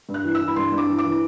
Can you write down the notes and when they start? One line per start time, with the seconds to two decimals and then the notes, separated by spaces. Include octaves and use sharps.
0.09 G2
0.14 F#6
0.24 E3
0.35 E6
0.41 E3
0.48 B5
0.56 G2 C6
0.72 G2
0.78 D6
0.88 E3
0.99 D6
1.05 E3